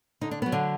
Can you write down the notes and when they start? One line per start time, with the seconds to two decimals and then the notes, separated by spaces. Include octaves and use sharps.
0.21 D3 D#4
0.31 D4
0.42 F#3 B3
0.52 D3 D4